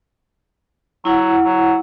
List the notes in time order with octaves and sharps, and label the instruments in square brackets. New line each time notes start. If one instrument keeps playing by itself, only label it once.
[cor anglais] F#3 [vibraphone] E4 F#5
[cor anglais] F#3